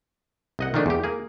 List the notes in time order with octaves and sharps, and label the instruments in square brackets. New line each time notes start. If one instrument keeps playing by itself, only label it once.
[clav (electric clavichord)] C2 D#5 F#5
D#3 F3 A3 D4 G#4
E2 G4
A#3 G#4